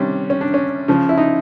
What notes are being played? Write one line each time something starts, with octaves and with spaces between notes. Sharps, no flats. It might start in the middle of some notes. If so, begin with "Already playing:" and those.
Already playing: C3 D#3 G3 C#4 D4
C#4
D4
C#4
C#3 F3
E4
D#4